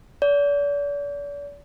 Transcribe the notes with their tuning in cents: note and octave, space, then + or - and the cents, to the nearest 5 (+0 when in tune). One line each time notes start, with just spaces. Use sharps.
D5 -40